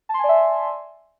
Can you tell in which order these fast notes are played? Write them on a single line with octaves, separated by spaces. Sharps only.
A5 C6 G#5 D5 E5